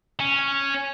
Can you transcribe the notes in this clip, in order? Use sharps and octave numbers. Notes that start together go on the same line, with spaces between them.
C#4